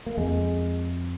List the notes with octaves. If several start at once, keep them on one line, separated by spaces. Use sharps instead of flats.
A#3
F2 G#3